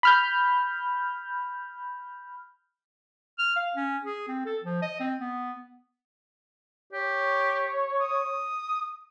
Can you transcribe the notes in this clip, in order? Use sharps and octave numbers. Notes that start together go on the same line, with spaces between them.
B5 F6 G6
F6
F5
C#4
G#4
C4
A4
F3
D#5
C4
B3
G4 C#5
D#6